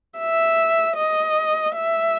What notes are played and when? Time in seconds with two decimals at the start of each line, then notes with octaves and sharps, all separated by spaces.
0.19 E5
0.96 D#5
1.75 E5